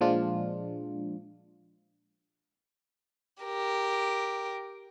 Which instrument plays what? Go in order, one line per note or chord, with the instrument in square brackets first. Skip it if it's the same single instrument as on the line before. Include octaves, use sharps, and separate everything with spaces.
[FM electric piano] A#2 F3 G#3 D4 F4
[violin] G4 A#4